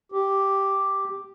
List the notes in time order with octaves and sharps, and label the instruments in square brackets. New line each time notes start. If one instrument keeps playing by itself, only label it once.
[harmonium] G4